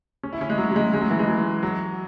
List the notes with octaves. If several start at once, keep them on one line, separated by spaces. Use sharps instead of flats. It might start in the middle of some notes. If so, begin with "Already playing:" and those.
C#4
E4
C#4
G#3
F#3
F#3
G#3
G#3
F#3
E3
G#3
F#3
F#3